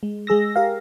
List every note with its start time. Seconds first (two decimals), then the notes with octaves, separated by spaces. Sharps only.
0.03 G#3
0.27 G#3 G#4 E6 A#6
0.56 G4 A#4 F5